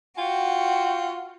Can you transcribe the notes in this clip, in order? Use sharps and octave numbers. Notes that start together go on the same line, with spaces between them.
F4 F#4 G5